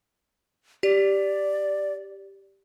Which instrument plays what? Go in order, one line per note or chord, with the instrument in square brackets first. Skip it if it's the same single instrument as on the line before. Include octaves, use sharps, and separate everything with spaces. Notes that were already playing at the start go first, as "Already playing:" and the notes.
[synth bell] G4 [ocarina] D5